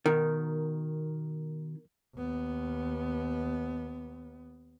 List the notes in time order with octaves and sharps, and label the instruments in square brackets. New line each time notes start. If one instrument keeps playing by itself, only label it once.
[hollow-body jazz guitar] B2 D#3 [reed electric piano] A#4
[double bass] D#2 B3